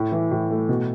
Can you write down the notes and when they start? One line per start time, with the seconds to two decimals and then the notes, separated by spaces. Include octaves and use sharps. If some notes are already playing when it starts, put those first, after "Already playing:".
Already playing: A2
0.12 E3
0.31 A2
0.50 A3
0.69 B2